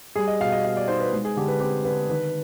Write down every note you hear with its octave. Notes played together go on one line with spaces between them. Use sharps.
G3 G#4
D#5
B2 F5
D#5
B3 F5
D5
D#4 C5
B4
G#3
G#4
D3 G4
B4
C4 G4
D3 B4
D#3 B4